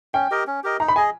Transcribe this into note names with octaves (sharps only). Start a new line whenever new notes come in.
C#4 G5
G4 A#4 D#5
C#4
G4 A#4 D#5
D#4 A#5
B5
G#4 D#5 G#5